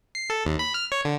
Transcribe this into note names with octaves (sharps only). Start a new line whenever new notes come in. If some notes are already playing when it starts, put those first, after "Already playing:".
C7
A4
D#2
B5
F6
C#5
D3